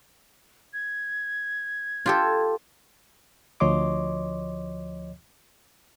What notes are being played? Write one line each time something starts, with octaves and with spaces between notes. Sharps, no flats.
G#6
F4 G4 A4
D2 F3 C#5 D#5 C6 D6